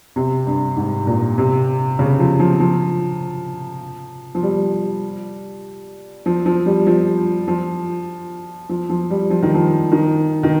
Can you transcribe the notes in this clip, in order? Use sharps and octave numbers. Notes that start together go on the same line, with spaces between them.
C3
G2
G#2
A#2
C3
C#3
F3
F3
F3
F3
G3
F3
F3
G3
F3
F3
F3
F3
G3
F3
D#3
F3
D#3
D#3